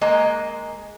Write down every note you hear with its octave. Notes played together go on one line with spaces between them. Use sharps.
G#3 A#3 D#5